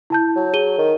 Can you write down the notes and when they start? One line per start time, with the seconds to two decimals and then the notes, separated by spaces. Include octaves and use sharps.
0.10 E4 A5 G6
0.36 F#3
0.53 G#4 D#7 G7
0.78 D#3